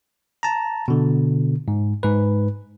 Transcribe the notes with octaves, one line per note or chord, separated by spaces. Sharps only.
A5 A#5
B2 D3
G#2
G#2 B4